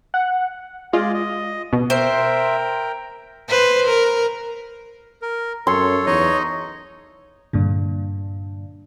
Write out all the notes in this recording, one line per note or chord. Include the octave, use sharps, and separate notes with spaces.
F#5
G#3 F4 G#4 D5 D#5
D#5
B2
A#4 C5 E5 G5
B4 C5
A#4
A#4
F#2 A4 C#5 C6
E2 D#4 C#5 D#5
G2 A#2 D3